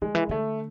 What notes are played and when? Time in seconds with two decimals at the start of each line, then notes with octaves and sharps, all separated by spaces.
0.02 D3 G#3
0.15 E3
0.29 D3 A3